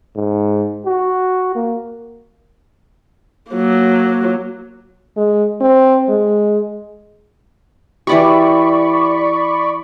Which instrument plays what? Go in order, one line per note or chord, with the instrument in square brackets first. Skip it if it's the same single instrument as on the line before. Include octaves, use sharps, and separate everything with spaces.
[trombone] G#2
F#4
A#3
[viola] F#3 A#3
[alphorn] G#3
C4
G#3
[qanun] E3 F#4 G4 [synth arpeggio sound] D5 B5 C#6